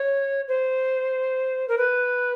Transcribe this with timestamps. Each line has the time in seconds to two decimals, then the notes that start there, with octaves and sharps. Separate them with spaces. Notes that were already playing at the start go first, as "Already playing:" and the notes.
Already playing: C#5
0.48 C5
1.68 A#4
1.78 B4